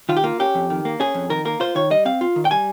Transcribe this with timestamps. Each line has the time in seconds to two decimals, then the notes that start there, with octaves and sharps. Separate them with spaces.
0.09 D#3 F4
0.16 G4
0.24 A#3 F4
0.40 C#4 G4
0.55 F2
0.70 D#3
0.85 A#3
1.00 C#4 G#4
1.14 F2
1.30 D#3 A#4
1.45 A#3 A#4
1.60 F4 C5
1.75 D#3 C#5
1.90 G3 D#5
2.05 C4 F5
2.21 F4
2.36 D#3
2.45 G5
2.51 G3 G#5